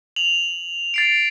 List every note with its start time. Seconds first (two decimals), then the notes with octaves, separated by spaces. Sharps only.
0.16 F7 F#7
0.94 A6 C7 D7